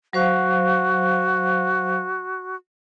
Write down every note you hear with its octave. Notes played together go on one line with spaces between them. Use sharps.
F#3 F#4 C5 F5